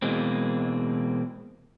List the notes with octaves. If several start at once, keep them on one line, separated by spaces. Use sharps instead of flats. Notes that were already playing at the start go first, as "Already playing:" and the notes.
B2 E3 G#3 A#3 C4